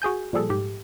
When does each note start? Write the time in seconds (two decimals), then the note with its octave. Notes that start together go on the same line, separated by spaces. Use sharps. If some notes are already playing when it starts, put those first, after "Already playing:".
0.02 F#4 G#4 G#5 G6
0.33 A#2 F3 G3 G#4 A4
0.50 G#2 G4